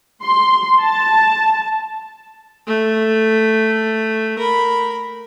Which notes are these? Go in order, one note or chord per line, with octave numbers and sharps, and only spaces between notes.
C6
A5
A3
A#4 B5